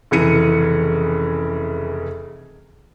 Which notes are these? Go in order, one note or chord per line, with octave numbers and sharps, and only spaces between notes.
F1 C#3 E3 C#7 D#7